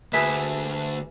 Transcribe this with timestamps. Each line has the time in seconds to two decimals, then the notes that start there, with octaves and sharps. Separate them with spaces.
0.13 D2 G#4 B4 E5